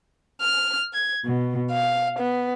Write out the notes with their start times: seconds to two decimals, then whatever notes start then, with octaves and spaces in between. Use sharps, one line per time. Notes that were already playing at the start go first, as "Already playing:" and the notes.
0.41 F6
0.93 G#6
1.24 B2
1.71 F5
2.19 B3